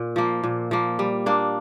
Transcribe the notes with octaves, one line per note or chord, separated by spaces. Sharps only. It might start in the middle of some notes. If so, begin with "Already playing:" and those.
Already playing: A#2
F3 A#3
A#2
F3 A#3
G3
A#3 D4